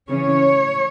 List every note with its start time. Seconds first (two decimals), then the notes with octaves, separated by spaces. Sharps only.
0.08 C#3 E3 C#4 C#5